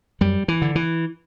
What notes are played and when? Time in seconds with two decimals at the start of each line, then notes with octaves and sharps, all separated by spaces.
0.21 F#2 G3
0.48 E3
0.62 D3
0.75 E3